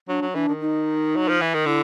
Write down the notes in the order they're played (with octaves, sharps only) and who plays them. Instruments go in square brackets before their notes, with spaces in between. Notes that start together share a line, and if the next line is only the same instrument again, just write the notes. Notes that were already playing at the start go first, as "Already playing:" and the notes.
[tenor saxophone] F#3 [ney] D4
[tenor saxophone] F#3
[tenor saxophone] E3 [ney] D4
[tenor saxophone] D#3
[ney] D#4
[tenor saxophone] F#3
F3
E3
D#3
[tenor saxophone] D3 [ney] E4